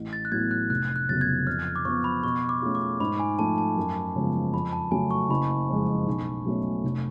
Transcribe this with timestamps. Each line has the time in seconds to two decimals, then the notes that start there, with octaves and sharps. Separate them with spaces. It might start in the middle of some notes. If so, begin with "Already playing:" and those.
Already playing: A1
0.13 A6
0.25 F#6
0.32 A2 F#3 B3 G#6
0.51 F#6
0.70 F1 F#6
0.96 F#6
1.09 F2 C#3 F#3 B3 A6
1.21 G#6
1.47 F2 F6
1.76 D6
1.85 F3 B3 C#6
2.04 B5
2.23 B2 C#6
2.49 D6
2.62 A3 C#4 F4 G#4
2.75 D6
3.00 G#2 B5
3.19 G#5
3.38 F3 A3 A5
3.58 A5
3.77 F#2
4.15 C#3 F3 G#3 B3
4.53 F2 B5
4.73 A5
4.91 C#3 F#3 A3 G#5
5.11 C#6
5.30 F#1 B5
5.69 F2 F3 G#3
6.07 B1
6.46 B2 F#3 A3 C#4
6.84 F1